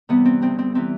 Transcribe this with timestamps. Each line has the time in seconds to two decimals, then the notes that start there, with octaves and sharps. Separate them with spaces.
0.09 C3 E3 G3 B3
0.25 C4
0.41 D2 C4
0.59 C4
0.75 C3 E3 G3 C4